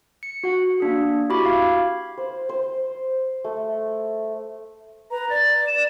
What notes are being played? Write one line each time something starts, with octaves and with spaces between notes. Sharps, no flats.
C#7
F#4 F#5
A#3 D4 G#4
E4 F#4 G4 B5 D6
F5 G#6
C5
C5
A3
B4 A#5
D5 A6
E7